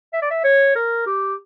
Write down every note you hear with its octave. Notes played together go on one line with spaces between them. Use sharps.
E5
D5
E5
C#5
A#4
G4